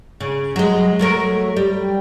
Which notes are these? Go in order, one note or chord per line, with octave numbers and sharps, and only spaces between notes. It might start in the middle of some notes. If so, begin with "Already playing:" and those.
C#3
F#3 G#3
F#3 A3 A#4
G3